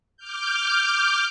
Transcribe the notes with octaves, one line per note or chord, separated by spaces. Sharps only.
D6 F6 G6